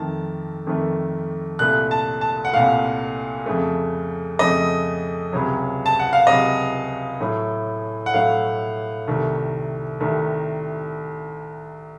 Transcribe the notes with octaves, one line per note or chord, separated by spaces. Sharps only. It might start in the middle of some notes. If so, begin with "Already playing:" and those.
Already playing: F2 D#3 A3 A5
F2 D#3 A3
C2 A#2 A3 F#6
A5
A5
F#5
C2 A#2 A3 F5
F2 C#3 A3
F2 C#3 A3 D#5
C#2 C3 F#3
A5
F#5
F5
C#2 C3 F#3 D#5
A2 F#3 A3
F#5
A2 F#3 A3 F5
C2 C3 D#3 A3
C2 C3 D#3 A3